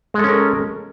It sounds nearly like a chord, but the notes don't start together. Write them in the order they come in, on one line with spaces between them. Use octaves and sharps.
G#3 A4 C#4 A#4